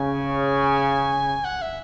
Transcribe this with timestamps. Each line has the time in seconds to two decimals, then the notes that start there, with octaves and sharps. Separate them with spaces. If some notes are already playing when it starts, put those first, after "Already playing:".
Already playing: C#3 G#5
1.45 F#5
1.62 E5